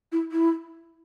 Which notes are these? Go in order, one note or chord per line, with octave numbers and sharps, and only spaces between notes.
E4
E4